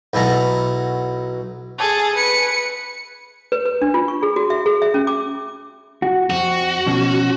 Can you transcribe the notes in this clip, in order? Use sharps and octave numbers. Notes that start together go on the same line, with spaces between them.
B1 B2 E4 A5 A#5
G#4 A4
B4 C#7
B4
B4
D4
F4
C#6
G#4
F#4
E5
G#4
E5
C#4
D6
F#4
F2 F#4
B2 F3 C#4